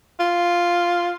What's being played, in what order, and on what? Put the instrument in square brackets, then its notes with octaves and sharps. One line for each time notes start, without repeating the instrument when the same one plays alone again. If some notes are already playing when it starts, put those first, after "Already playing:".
[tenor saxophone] F4